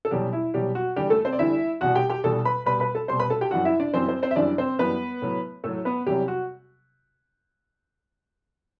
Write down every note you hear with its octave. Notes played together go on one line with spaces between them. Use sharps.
A4
E2 B2 F#3 G3 G4
E4
E2 B2 F#3 G3 G4
F#4
E2 D3 G3 G4
A3 A4
C4 C5
D5
E2 D3 G3 E4 E5
E2 B2 G3 F#4 F#5
G4 G5
G4 G5
E2 B2 G3 A4 A5
B4 B5
B2 G3 B4 B5
B4 B5
A4 A5
B2 G3 C5 C6
B4 B5
A4 A5
G4 G5
F#2 E3 G3 F#4 F#5
E4 E5
D4 D5
F#2 E3 G3 C4 C5
C4 C5
C4 C5
E5
F#2 E3 G3 D4 D5
C4 C5
F#2 E3 G3 B3 B4
A2 F#3
A2 F#3 A3 A4
B3 B4
E2 C3 F#3 G3 G4
F#4